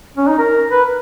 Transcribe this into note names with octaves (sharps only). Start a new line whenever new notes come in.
C#4
D#4
A#4
B4